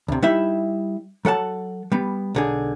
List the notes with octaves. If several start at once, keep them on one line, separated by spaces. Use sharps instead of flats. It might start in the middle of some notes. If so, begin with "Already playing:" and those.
D2 C3
G3 D#4 E4 E5
F#3 A4 F#5 A5
G3 B3
B1 D3 G#4